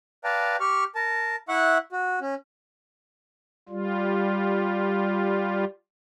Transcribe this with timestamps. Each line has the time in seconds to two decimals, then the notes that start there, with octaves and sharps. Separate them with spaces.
0.24 B4 D5 F5 G5 A5 A#5
0.60 G4 C#6 F6
0.95 A#4 A5
1.49 E4 E5 F#5 C#6 F#6
1.92 F#4
2.21 C#4
3.69 G3 F4